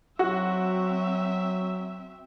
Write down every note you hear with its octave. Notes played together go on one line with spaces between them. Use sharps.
F#3 C4 F#4 E5